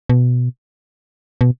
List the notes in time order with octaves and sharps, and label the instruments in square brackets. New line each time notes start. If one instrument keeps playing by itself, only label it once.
[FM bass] B2
B2